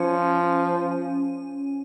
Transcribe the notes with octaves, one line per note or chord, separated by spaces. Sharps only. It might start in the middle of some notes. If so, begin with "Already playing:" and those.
Already playing: F3 C#4